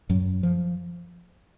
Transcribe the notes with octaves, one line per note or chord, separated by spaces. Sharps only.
F#2 F#3
F3